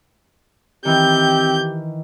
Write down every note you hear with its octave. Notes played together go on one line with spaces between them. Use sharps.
D#3 E3 C4 G4 G6